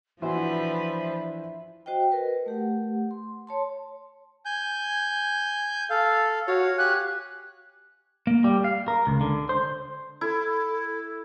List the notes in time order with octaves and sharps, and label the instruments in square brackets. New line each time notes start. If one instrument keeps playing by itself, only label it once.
[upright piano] E3 E4 F#4 [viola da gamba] F3 D4 B4 [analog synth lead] C5 [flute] E5
[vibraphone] F#4 C5 D#5 G5
A#4 B4
A3 G4 F#5
C6
C#5 A5 C6
[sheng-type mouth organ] G#5 G6
A4 F5
[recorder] F#4 [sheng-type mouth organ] C#5 F5
[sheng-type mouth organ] G4 G#5 [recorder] F#6
[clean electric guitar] A#3
G3
F5
A#4
C#2
D3
C5
[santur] E4 [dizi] A4